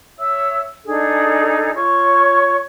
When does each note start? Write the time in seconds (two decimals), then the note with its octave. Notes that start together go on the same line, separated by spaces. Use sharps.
0.19 C#5 E5 E6
0.85 D4 D#4 G#4 A4
1.75 F4 C#5 C#6